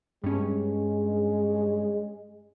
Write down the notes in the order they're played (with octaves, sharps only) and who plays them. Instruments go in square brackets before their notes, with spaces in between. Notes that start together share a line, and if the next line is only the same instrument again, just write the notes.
[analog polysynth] G2 C#4 [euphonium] G#3